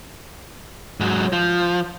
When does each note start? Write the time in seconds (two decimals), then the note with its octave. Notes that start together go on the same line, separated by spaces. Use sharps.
1.00 G#2 F#3
1.33 F3